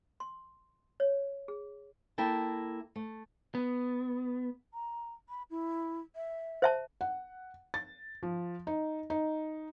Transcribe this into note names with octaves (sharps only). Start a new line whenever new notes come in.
C6
C#5
G#4
A#3 E4 A4 G5 A5
A3
B3
A#5
B5
E4
E5
C5 E5 A5
F#5
A6
F3
D#4
D#4